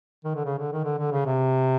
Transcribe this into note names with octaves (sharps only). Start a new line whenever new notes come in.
D#3
D3
C#3
D3
D#3
D3
D3
C#3
C3